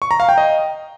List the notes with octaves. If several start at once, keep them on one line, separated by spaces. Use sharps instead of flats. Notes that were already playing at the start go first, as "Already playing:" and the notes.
C#6
A#5
F5
G5
D#5